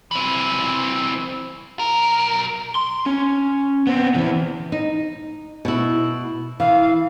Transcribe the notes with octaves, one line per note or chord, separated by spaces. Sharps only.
E3 C4
B1 A#4
C6
C#4
B3 C4
E3 B3
D#4
B2 E4
E3 F5